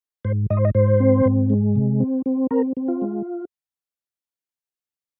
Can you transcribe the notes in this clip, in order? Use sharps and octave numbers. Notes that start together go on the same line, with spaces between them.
G#2 C5
G#2 D#5
C5
D#5
G#2 C5
C4
G#2
G#3
C3
C4
C4
C4 A#4
C4
F4
G#3